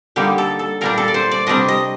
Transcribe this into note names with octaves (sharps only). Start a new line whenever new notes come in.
D3 G3 A#3 D#4 G4
A4
A4
A#2 G3 D4 A#4
A4
D5
C5
D5
C3 G3 D4 D#5
D#5